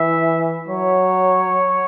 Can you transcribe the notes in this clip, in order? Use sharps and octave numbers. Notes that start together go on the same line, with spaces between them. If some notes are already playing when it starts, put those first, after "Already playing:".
Already playing: E3 E5
F#3 C#5